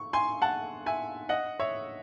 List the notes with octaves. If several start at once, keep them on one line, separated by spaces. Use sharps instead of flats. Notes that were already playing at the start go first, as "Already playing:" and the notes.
Already playing: C#6
G#5 C6
F#5 A5
E5 G#5
D#5 F#5
C#5 E5